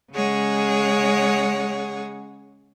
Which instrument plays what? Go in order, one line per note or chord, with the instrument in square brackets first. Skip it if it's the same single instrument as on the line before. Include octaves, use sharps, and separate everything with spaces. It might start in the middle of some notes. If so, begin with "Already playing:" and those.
[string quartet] C#3 G#3 G#4 C#5 F#5